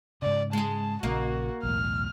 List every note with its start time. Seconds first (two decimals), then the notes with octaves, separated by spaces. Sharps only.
0.22 G#2 C#3 D5
0.53 G#3 G#4 A5
1.03 A#1 C#3 A#3 F#4 D#5
1.63 B1 E2 A2 F6